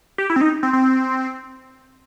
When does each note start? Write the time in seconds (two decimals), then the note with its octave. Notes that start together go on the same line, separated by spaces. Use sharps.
0.18 G4
0.30 E4
0.36 C4
0.41 D#4
0.63 C4
0.73 C4